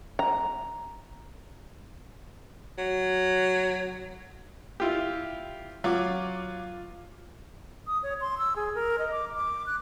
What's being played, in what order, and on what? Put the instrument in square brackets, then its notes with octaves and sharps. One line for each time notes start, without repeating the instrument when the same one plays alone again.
[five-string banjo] A#5
[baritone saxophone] F#3
[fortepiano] E4 F4 G4
[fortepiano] F#3 [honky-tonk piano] F4 D6
[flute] D#6
C#5
C6
E6
G#4
A#4
D#5
D6
D6
F#6